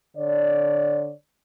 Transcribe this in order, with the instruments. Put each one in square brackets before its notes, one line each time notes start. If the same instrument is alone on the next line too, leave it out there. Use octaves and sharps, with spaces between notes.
[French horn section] D3 C#5 D5